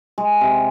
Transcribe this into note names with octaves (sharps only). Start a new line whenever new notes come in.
G#3
C3